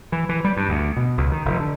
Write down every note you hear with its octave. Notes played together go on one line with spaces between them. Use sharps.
E3
E3
G3
G2
D2
B2
C#2
D#3
F1
D3